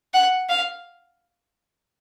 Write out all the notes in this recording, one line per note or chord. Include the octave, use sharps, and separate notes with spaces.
F#5
F5